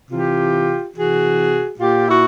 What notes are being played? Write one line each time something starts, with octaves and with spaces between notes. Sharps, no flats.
C3 E3 F4 G4
C3 E3 F#4 G#4
A#2 F4 G4
E4 F#4